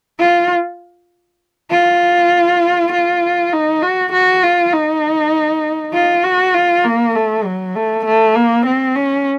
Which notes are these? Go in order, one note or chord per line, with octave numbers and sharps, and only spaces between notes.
F4
F4
F4
D#4
F#4
F#4
F4
D#4
F4
F#4
F4
A#3
A3
F#3
A3
A3
A#3
C4
C#4